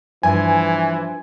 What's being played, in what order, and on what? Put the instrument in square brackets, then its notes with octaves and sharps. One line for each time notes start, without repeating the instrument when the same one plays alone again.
[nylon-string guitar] G2 F3 [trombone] E3 [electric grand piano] G#5